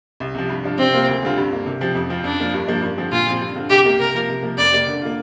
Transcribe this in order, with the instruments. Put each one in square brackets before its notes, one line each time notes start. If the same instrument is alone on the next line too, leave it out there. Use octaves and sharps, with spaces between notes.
[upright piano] C2
C3 F3
G2
F3 D4 F4
[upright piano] C3 [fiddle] C4
[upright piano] A#3 F4
D2
D3 G3 C4 F4
G2
D3 A#3
C3
F3 C4 G4
F2
F3 C4 F4
[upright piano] F2 [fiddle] D4
[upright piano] F3 A#3 F4
G2
F3 A#3 D4
G2
D3 F3 C4
[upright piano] A#2 [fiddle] F4
[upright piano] F3 C4
G2
D3 G3 C4 F4
[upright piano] C2 [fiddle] G4
[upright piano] C3 A#3
[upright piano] C3 [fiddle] A#4
[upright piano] F3 A#3 F4
C3
F3 A#3
[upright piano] F2 [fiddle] D5
[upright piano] C3 A#3 G4
D3
A#3 F4